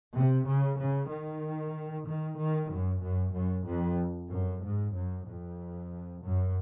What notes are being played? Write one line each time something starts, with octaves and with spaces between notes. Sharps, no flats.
C3
C#3
C#3
D#3
D#3
D#3
F#2
F#2
F#2
F2
F#2
G#2
F#2
F2
F#2